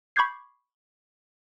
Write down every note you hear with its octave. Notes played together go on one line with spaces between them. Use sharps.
B5 C#6 D6 G6 G#6 C7